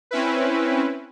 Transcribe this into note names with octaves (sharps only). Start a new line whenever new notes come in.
C4 C#4 E4 B4